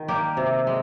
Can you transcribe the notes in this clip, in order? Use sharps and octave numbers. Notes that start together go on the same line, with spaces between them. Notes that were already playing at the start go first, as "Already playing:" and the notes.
Already playing: D#3
G3 A#3 G4
C3
G#3